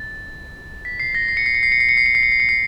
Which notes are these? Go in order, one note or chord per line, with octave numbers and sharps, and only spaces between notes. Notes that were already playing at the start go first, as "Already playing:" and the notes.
Already playing: A6
B6
C7
A#6
C7
C#7
C7
C#7
C7
C#7
C7
C#7
C7
C#7
C7
C#7
C7
C#7
C7